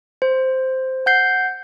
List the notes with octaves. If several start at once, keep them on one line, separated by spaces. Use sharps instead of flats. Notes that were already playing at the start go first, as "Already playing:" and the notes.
C5
F#5 G6 C7